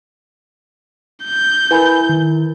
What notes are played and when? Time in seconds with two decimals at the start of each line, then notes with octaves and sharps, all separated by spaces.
1.25 G6
1.71 E4 A#4 B4 G#5 B5
2.09 D#3